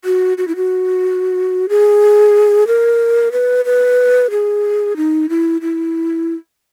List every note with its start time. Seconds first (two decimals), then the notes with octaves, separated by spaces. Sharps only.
0.05 F#4
0.38 F#4
0.48 E4
0.56 F#4
1.69 G#4
2.67 A#4
3.32 B4
3.65 B4
4.31 G#4
4.97 D#4
5.29 E4
5.61 E4